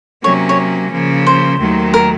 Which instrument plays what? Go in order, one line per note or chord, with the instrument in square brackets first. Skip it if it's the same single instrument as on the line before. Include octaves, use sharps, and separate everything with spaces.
[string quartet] C3 F#3 A#3 C#4 [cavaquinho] C#5
[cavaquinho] C#5
[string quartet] C#3 F3 A#3
[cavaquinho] C5
[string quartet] D#2 D#3 F#3 A3
[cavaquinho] A#4